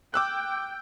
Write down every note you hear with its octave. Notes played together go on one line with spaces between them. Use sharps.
G5 D6 E6 F#6